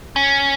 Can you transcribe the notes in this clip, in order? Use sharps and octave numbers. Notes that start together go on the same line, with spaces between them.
C#4